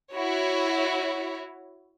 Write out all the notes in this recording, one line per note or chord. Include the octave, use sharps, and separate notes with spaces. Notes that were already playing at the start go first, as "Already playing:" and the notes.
E4 F#4 C#5